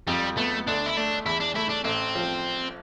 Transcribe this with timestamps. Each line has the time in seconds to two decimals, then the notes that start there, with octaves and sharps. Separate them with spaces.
0.08 F2 G3
0.37 A3 B3
0.67 D2 D4
0.86 E4
0.97 A3 D4
1.26 E2 E4
1.41 D4
1.56 A3 E4
1.70 D4
1.85 A1 C4
2.15 F3